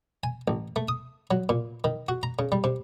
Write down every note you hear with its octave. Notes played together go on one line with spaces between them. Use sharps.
G#5
A1
A3
D#6
F#3
A#2
D#3
F#4
A#5
C#3
G3
C3